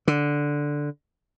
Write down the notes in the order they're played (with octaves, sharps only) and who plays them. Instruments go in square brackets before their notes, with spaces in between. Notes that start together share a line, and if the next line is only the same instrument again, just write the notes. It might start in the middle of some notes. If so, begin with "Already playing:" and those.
[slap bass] D3